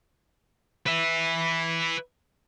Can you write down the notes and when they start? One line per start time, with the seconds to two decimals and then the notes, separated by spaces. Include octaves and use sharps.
0.86 B4 E5